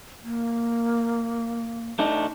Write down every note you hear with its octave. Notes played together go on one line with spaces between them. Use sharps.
A#3
A3 D4 D#4